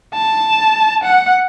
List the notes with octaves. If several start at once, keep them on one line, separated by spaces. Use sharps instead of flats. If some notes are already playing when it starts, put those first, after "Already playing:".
A5
F#5